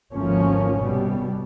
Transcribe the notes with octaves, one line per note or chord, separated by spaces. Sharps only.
G#1 D2 F3 A#3 C#4
C2 B2 G3